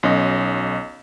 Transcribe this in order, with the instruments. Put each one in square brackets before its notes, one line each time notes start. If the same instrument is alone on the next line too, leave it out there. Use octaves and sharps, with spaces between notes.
[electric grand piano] B1 C#4 D#5